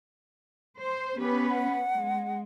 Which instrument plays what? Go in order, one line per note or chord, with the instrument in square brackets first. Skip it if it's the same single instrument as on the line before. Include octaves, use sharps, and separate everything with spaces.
[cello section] C5
[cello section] B3 C#4 B4 [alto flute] G4
[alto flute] F#5
[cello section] G#3